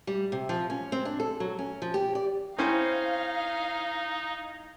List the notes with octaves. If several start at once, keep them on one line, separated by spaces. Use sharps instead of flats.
G3
C3
F3
C#4
C4
D4
A4
F#3
C#4
F3
G4
D5
C4 C#4 D#4 E4 C5 E5 F5